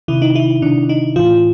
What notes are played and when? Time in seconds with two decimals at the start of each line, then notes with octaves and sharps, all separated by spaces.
0.08 C3 D#3 E4
0.22 D#4
0.35 E4
0.62 C3 D#3 D4
0.89 D#4
1.16 A2 E3 F4